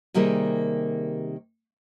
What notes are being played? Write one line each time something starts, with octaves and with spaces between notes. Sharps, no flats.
C3 D#3 G3 A#3 G4 G#4